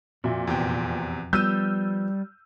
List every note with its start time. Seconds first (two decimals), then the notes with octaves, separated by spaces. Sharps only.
0.24 F2 A#2 F#4 E5
0.47 E2 C3 G5
1.33 F3 G3 B3 E6 F6 G6 D#7